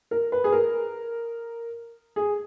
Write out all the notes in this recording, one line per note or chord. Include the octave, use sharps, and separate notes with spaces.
A#4
B4
G#4
A#4
G#4